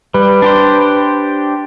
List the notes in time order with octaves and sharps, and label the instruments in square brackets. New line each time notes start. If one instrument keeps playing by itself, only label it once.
[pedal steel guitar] G3 [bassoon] B4
[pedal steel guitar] D4 G4 C5